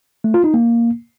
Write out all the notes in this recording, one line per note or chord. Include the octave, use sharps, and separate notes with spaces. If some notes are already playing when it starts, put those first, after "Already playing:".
A3
F4
D#4
A#3